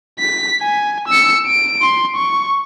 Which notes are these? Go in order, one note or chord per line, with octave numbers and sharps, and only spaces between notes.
B6
G#5
E6 C#7
D7
C6
C#6